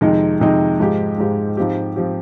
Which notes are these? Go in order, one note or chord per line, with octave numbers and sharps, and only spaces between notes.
F2 C3 D#3 G#3 D#4
F2 C3 D#3 G#3 D#4
G#2 F3 G#3 D#4 G4
G#2 F3 G#3 D#4 G4
G#2 F3 C4 G4
F3 C4 G4